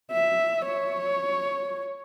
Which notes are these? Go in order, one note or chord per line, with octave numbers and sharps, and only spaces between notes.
E5
C#5